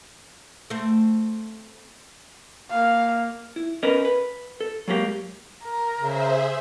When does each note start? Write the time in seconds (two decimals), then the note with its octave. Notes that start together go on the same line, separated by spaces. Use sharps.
0.70 A3 C4
2.70 A#3 F5
3.56 E4
3.83 C#4 A#4 B4 D#5
4.05 B4
4.61 A4
4.88 F#3 G#3 A#3 G4
5.64 A#4
6.00 C#3 G#4 C5 E5